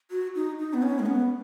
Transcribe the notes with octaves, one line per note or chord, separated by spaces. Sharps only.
F#4
D#4
D#4
B3
C#4
G#3
B3